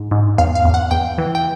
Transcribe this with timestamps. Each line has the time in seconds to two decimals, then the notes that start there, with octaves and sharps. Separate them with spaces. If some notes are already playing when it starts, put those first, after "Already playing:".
Already playing: G#2
0.11 G#2
0.38 E2 F5
0.55 F5
0.65 E2
0.74 F#5
0.91 E2 G5
1.18 E3
1.35 G5